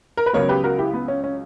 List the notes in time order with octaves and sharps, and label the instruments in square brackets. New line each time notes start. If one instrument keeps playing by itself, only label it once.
[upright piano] A#4
B4
C#2 C#3 F#3 B3 A#4 C#5
G4 B4
F#4 A#4
E4 G4
B3
C#4
C#4